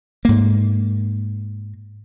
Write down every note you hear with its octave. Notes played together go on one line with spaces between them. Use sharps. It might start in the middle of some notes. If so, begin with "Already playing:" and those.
G#2 A#3